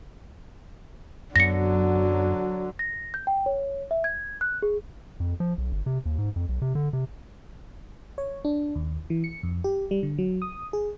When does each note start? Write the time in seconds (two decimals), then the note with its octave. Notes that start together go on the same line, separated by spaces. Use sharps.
1.36 F#2 D3 F#3 B3 A#6 C#7
2.79 A#6
3.14 G6
3.27 G5
3.46 C#5
3.91 E5
4.04 G#6
4.41 F#6
4.62 G#4
5.20 F2
5.40 F3
5.58 B1
5.72 G1
5.86 C3
6.06 D#2
6.18 G#2
6.36 F2
6.49 B1
6.62 C3
6.75 D3
6.93 C3
8.18 C#5
8.45 D4
8.75 D#2
9.10 E3
9.24 C#7
9.43 F2
9.64 G4
9.91 G3
10.03 D3
10.18 F#3
10.42 D#6
10.73 G#4